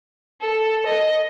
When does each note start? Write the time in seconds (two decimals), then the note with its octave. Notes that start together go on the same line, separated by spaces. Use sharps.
0.41 A4
0.86 D#5